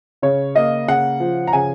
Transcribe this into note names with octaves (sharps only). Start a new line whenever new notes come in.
C#3 C#5
A#3 D#5
C#3 F#5
F3
A#5
C#3 G#5